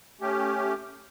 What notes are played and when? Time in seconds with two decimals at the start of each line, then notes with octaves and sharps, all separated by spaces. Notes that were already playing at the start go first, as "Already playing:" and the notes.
0.21 A3 C#4 G4